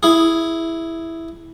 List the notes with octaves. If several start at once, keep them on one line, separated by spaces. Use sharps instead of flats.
E4 G#4